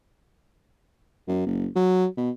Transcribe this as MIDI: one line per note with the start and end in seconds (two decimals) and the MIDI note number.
1.28 1.45 42
1.46 1.67 30
1.76 2.06 54
2.17 2.30 47